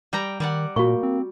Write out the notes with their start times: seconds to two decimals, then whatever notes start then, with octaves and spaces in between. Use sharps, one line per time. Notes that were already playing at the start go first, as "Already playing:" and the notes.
0.13 G3 G5 A#5
0.40 D#3 G3 D5 F#5
0.76 A#2 A#3 F#4 C#6
1.03 C4